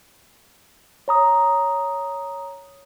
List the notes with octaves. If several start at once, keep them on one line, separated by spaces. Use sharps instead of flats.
C#5 A#5 D#6